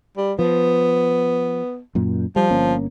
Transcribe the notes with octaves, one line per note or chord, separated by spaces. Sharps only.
G3
F3 B3
F#2 A#2
F3 G3
G1 A#3 C#4